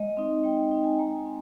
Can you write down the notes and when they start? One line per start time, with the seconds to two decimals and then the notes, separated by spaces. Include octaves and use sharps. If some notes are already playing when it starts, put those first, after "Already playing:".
Already playing: G#3 D#5
0.17 C4 D#4
0.44 G#3 G5
0.57 G5
0.71 C4 D#4
0.84 G#5
0.99 G#3 A#5
1.16 G#5
1.25 C4